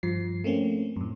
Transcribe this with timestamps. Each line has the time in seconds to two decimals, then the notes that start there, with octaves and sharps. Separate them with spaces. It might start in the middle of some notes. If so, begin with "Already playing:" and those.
0.03 G2 F3 C7
0.44 A3 A#3 C4 C#4
0.96 F#2 A2